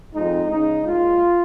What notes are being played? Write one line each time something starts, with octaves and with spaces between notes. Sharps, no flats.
F2 F3 G#3 D#4
C#3 G#3 D#4
A#2 G#3 F4